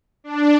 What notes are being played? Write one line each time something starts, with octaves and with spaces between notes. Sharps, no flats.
D4